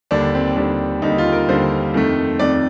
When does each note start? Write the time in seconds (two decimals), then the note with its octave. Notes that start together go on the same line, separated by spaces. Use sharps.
0.11 D#2 D3 G3 D4
0.35 C4
0.56 D#2 D3 G3 D4
1.02 D#2 D3 G3 D#4
1.18 F4
1.33 A#4
1.48 D#2 D3 G3 C5
1.94 F2 D#3 A3
2.40 F2 D#3 A3 D5